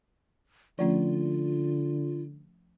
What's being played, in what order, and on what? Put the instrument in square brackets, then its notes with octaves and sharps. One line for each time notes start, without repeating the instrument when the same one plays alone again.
[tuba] D3 [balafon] F3 A3 C#4 [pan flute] F4